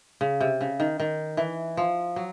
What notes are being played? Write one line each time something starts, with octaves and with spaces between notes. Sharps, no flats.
C#3
C3
C#3
D#3
D#3
E3
F3
F#3